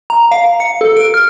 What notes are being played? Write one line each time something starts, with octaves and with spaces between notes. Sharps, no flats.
A#5
F5
C#7
A4
D7
F6